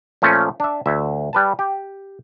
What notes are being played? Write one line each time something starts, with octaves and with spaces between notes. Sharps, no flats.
A#2 F3 A3 A#3 C#4
D4 E5
D2 E5
G3 B4 A5
G4